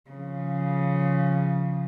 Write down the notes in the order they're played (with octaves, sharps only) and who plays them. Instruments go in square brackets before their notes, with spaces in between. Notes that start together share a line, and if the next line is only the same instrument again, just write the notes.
[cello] C#3 F3